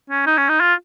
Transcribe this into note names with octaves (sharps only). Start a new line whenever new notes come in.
C#4
D#4
C#4
D#4
F4